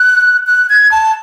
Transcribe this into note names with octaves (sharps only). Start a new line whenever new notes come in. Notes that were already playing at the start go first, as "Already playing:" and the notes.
Already playing: F#6
F#6
G#6
A5